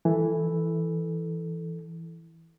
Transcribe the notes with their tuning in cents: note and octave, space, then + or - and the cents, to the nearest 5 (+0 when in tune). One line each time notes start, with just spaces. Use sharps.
E3 +0 A4 +0